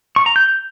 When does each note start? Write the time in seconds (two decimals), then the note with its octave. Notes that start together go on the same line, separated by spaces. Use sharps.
0.16 C#6
0.26 A#5
0.36 G6